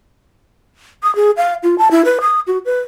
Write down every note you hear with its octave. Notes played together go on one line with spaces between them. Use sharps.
D#6
G#4
F5
F4
A5
E4
B4
D#6
F#4
B4